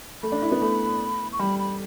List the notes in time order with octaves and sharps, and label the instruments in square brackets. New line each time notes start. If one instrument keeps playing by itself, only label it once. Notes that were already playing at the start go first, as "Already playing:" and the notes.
[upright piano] A3 [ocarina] B5
[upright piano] D4
E4
B3
A3
[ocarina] C#6
[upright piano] G3 [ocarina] B5
[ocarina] B5